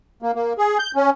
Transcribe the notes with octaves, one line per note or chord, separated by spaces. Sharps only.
A#3
A#3
G#4
G6
C#4